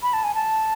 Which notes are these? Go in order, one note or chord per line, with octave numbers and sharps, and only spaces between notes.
B5
A5
G#5
A5